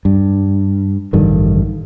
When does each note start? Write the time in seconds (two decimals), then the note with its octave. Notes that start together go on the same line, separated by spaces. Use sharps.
0.05 G2
1.13 A1 G2 D3 D#3